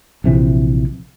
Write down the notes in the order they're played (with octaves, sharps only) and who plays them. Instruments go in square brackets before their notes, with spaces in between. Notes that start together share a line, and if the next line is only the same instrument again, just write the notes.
[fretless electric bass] A#1 C3 E3